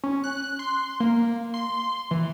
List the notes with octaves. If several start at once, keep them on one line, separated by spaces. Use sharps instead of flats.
C#4
F#6
C6
A#3
C6
E3